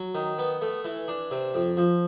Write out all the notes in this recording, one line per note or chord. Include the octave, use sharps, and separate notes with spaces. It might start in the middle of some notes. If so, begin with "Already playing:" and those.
Already playing: F#3
D#3
B3
A3
E3
D4
C3
F2
F3